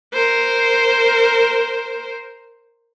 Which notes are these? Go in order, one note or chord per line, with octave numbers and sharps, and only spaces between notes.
A#4 C5